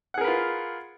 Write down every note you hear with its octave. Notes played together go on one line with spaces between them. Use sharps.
F4 G#4 A#4 B4 F#5